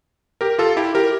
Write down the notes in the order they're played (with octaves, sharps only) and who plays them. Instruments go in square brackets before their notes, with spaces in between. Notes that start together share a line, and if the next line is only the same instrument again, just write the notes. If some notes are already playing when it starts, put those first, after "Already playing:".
[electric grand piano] G4 A#4
F4 A4
E4 G4
G4 A#4